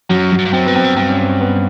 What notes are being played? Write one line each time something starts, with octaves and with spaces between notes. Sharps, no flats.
F#2 F#3
F#3
F#2
G2
F#2 C4
G2 B3
F#2 C4
G2
G2 C4
C#4
C4
B3